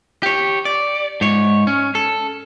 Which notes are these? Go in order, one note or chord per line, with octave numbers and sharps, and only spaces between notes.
G4 C#5
D5
G#2 C#5
C#4
A4